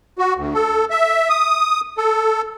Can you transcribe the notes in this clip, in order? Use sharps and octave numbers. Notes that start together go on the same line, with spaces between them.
F#4
D2
A4
E5
D#6
A4